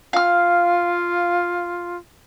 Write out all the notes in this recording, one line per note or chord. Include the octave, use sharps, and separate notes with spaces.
F4 F5 F6